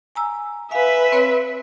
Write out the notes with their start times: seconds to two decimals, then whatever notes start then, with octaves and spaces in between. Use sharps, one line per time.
0.15 G#5 A#5 E6
0.71 B4 E5 F5 G#5
1.12 C4 C#5